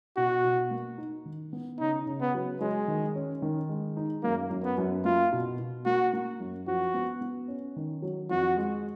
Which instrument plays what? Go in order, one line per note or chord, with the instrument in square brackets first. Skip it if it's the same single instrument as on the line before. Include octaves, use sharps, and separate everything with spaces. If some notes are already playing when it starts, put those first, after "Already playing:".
[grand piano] B2 [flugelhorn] F#4
[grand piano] B2
A#3
D#4
D#3
B3
[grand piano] C#3 [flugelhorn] D#4
[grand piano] C#3
[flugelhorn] B3
[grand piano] F#3
[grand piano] F#3 [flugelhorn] G#3
[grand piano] D#3
C#4
D#3
G#3
D#4
[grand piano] F#2 [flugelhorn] A#3
[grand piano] F#2
[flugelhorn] B3
[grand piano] F#2
[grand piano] A#3 [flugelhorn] F4
[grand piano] B2
B2
[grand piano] A#3 [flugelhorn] F#4
[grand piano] A#3
F#2
[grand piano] F3 [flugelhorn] F#4
[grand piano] B3
B3
C#4
D#3
F#3
[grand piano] F2 [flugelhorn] F#4
[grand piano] G#3